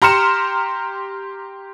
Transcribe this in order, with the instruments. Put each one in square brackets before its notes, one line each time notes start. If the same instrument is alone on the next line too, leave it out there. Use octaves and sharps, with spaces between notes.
[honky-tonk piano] G4 A#5 C6 F6 C#7 E7